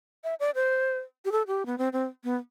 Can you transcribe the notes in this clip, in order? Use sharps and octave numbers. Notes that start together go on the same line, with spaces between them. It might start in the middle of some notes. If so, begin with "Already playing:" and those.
E5
D5
C5
G4
A4
G4
B3
C4
C4
B3